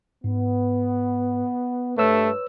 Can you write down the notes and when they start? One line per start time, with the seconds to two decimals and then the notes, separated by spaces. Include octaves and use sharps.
0.24 G#2 B3
1.98 G2 A3 B4 C#5 E6